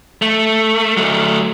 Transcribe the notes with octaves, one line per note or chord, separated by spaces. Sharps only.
A3
F#3 A3